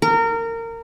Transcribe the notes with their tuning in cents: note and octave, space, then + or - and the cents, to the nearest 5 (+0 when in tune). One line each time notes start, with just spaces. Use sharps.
A#4 -25